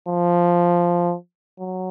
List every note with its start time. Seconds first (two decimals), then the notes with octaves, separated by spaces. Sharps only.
0.09 F3
1.59 F#3